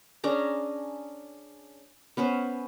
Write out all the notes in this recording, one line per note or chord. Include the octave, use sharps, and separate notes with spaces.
C#4 D4 G#4 A#5
B3 C#4 B4 C5